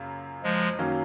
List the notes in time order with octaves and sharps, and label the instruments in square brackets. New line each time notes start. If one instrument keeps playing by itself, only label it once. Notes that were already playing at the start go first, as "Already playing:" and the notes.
Already playing: [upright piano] F#2 C#3 A#3 F4
[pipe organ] F3 G#3
[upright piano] F#2 D#3 F#3 A#3 C#4